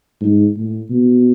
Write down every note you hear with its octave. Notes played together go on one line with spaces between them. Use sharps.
G#2
A2
B2